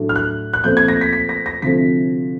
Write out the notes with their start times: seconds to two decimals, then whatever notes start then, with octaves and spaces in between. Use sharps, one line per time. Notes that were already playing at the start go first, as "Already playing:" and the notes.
Already playing: A2 F#3 A3 D4
0.09 F6
0.16 F#6
0.53 F#6
0.64 A#2 F3 A3 C4 G6
0.77 G#6
0.88 A#6
1.01 B6
1.13 B6
1.29 A#6
1.46 A#6
1.62 D2 C3 F3 A3 C4 B6